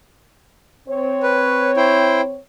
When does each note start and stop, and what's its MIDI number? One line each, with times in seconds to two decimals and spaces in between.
0.89 2.37 60
0.89 2.37 73
1.23 1.71 71
1.77 2.21 64
1.77 2.21 72
1.77 2.21 79